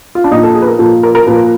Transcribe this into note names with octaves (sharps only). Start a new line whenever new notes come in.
F4
D4
A#2 F3 D#4
A4
G#4
B4
A#4
A#2 F3 A4
A#4
A#4
A#2 F3 B4